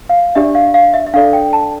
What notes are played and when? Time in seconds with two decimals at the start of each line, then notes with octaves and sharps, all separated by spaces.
0.09 F5
0.35 D4 G4 D5 E5
0.55 F5
0.74 F5
0.94 E5
1.06 E5
1.14 D4 A4 D5 F5
1.33 G5
1.53 A5